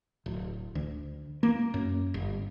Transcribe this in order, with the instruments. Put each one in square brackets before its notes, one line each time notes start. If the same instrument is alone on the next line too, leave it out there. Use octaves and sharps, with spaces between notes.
[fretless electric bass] D1
D2
A#3
F#2
G1